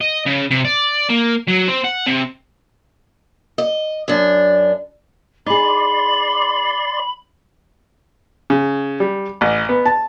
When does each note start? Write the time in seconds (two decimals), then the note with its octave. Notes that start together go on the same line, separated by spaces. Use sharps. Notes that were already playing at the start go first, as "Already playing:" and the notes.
0.01 D#5
0.26 C#3
0.51 C3
0.65 D5
1.09 A#3
1.47 F#3
1.68 C4
1.84 F#5
2.06 C3
3.58 D#5
4.08 F#2 D4
5.46 D#4 G#4 D5 B5 C6
8.50 C#3
9.00 G3
9.41 A1
9.69 B3
9.86 A5